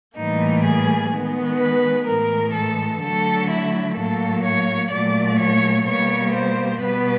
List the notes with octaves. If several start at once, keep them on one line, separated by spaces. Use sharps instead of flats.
A2 E3 G3 A#3 D#4
G#4
D#3 G#3 B3
B4
A2 E3 G#3 A#4
A4
D3 F#3 A3 A4
E4
A2 F#3 A#3 A4
C#5
A#2 F#3 A3 D5
C#5
B2 G3 A#3 C#5
C5
B2 G3 B3 B4